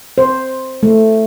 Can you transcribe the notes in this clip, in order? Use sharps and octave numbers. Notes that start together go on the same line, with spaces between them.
C5
A3